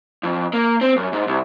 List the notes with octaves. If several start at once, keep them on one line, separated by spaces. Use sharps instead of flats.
F2
A#3
C4
F#2
G#2
C2